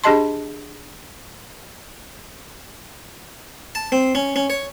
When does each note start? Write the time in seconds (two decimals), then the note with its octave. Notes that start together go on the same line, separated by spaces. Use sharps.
0.04 D4 G4 G#4 D#5 A5 C6
3.75 A5
3.92 C4
4.15 C#4
4.36 C#4
4.50 C#5